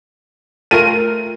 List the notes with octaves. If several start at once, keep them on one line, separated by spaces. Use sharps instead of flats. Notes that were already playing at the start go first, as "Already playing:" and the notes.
A3 F4 A#4 D#7